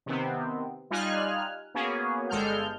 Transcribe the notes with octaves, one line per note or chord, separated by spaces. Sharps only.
C3 D#3 B3 C4
G3 D#4 F4 G#5 F6 F#6
A#3 B3 C#4 F#4 G#4
G1 G2 G#3 A4 F6 G6